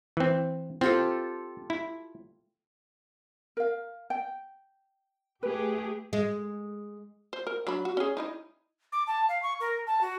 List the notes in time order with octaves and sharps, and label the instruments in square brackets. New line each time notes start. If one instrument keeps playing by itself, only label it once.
[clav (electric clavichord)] E3 C4
[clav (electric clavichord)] C4 [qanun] F4 G4 A4
[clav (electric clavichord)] E4
[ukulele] A#4 F5
G5
[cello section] A3 G4 G#4 [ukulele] B4
[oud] G#3
[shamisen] C5
A#4
F#3 D4 B5
F#4
C#4 F#4 G#4
D#4 E4 D#5
[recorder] D6
A5
F5
C#6
A#4
A5
F#4